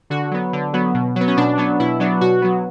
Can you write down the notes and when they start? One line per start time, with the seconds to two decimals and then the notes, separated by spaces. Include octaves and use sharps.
0.10 D3 F#4
0.31 F#3 B3
0.53 D3
0.73 F#3 B3
0.94 B2
1.16 F#3 B3
1.27 C#4
1.37 B2 D4
1.57 F#3 B3
1.79 B2 E4
2.00 F#3 B3 D4
2.21 B2 F#4
2.42 F#3 B3